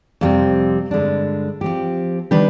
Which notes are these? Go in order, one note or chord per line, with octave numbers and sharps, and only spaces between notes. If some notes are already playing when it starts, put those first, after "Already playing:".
F2 C3 G3 C4
G2 D3 G#3 D4
F3 C4 G4
D#3 G3 D4 G4 B4